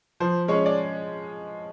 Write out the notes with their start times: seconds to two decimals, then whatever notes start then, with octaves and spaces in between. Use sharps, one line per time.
0.20 F3 C5
0.48 G#3 C#4 C#5
0.66 D5